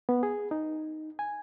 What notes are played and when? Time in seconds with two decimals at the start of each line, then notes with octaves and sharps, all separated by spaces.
0.09 B3
0.23 G#4
0.51 D#4
1.19 G#5